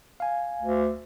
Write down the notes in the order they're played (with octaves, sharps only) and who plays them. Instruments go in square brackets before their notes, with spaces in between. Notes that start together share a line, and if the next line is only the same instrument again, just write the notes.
[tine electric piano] F5 G#5
[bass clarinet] D2